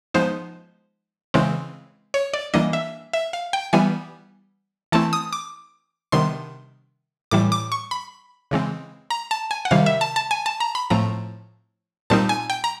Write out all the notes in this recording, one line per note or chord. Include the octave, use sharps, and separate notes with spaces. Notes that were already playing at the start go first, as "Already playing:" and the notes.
F3 G#3 B3 D#4 C5
C#3 E3 G#3 C4
C#5
D5
E3 G3 A#3 D4 D#5
E5
E5
F5
G5
E3 G3 B3 G#5
E3 A3 C4 E4 A5
D#6
D6
C3 D#3 G3 B3 D4 C6
A2 E3 G3 D6
D6
C#6
B5
C#3 E3 G#3 C4
A#5
A5
G#5
F#5
C3 D#3 G3 F5
E5
A5
A5
G#5
A5
A#5
B5
A2 F3 A3 C4 A#5
A#2 G3 C4 D#4 A5
G#5
G5
A#5